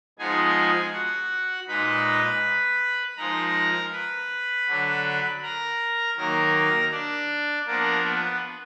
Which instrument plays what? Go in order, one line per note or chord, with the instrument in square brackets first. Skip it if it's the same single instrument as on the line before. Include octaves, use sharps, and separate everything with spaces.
[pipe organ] F3 G#3 B3 D#4 G#4 G#5
F#4 F#5
A#2 G#3 D#4 B4 B5
F3 G#3 D#4 A#4 A#5
B4 B5
D3 F#3 D4
A#4 A#5
D#3 F#3 A#3 A#4 A#5
D4 D5
F3 A#3 B3 D4 A#4
B3 B4